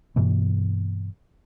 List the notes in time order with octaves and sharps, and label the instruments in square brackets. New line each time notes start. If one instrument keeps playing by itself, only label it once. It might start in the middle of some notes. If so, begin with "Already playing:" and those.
[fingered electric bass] G2 B2 E3 A#3